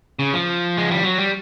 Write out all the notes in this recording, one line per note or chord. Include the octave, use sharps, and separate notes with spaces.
C#3
F3
G#3
G3
F#3
G3